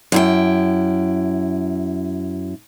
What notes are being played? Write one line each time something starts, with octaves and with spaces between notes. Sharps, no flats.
F#2 E4 G5